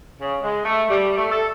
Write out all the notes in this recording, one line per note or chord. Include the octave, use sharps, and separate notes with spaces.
C#3
G#3
A3
G3
A3
A4